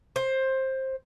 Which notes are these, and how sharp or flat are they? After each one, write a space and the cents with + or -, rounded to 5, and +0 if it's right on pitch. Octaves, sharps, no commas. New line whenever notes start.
C5 +15